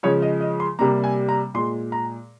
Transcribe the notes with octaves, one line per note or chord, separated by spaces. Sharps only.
C#3 F3 G#3 C#5
D#5
D#5
C6
C3 G3 A#3 A#5
G#5
A#5
A#2 G#3 C6
A#5